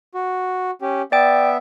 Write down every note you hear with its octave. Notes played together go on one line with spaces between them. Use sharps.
F#4
C#4 G4
B3 D5 E5 G5